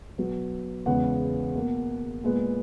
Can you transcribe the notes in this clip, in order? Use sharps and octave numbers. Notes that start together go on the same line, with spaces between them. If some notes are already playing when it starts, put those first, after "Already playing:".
B2 F#3 B3
E2 C#3 G#3 B3 F#5
B2 A#3
A#2 G#3 B3